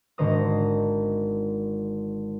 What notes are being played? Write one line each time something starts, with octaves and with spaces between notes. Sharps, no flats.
G#1 D3 D#3 C5 A#5 D#6